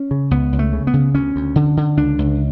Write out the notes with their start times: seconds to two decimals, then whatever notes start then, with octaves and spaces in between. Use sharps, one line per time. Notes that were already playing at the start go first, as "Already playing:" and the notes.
Already playing: C#4
0.11 C#3
0.31 C#2 B3
0.53 C#2
0.59 A3
0.73 C#3
0.87 B3
0.93 C#3
1.14 D2 C#4
1.36 D2
1.56 D3
1.77 D3
1.97 C#2 D4
2.19 C#2